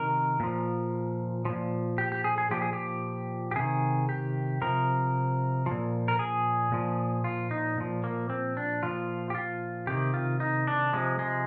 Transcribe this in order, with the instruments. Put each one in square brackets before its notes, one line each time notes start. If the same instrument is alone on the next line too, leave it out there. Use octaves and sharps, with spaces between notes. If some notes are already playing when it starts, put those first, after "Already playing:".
Already playing: [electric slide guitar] C3 D#3 A#4
A#2 F3
A#2 F3
G4
G4
G#4
G#4
A#2 F3 G4
G#4
G4
G4
C3 D#3 G#4
G4
C3 F3 A#4
F3
A#2
A#4
G#4
A#2 F3
F4
D#4
A#2 F3
A#3
C4
D4
A#2 F3 F4
G4
F4
C3 D#3 G4
F4
D#4
D4
C3 F3 G#3
G#3